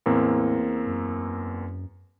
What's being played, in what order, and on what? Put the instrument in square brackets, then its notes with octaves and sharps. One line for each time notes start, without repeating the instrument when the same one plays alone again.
[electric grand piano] E2 A#3 C4 [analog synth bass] A2
[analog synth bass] F#2